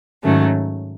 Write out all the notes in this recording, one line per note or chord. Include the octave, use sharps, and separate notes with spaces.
G#2 D#3 F#3 A3 C#4